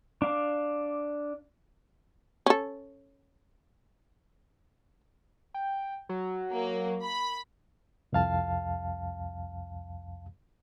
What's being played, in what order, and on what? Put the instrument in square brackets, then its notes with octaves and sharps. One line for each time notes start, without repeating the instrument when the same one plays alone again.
[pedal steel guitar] D4 F5 D6
[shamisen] C#4 A4
[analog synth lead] G5
F#3
[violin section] A#3
B5
[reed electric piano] C2 F2 F5 A5